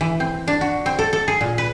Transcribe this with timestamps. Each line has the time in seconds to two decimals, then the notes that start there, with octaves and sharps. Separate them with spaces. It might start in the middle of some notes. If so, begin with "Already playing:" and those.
0.01 E3
0.20 C4
0.48 D4
0.61 F#4
0.86 C4
0.99 A4
1.13 A4
1.28 G#4
1.41 A#2
1.58 B4